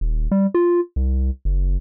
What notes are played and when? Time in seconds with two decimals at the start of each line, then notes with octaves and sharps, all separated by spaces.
0.01 D#1
0.31 G3
0.54 F4
0.96 C2
1.45 F#1